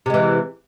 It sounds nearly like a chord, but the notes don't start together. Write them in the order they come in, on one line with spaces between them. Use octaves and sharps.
C3 G#3 E3